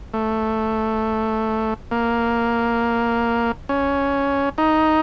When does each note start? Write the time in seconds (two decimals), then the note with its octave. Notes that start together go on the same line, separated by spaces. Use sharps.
0.14 A3
1.91 A#3
3.69 C#4
4.58 D#4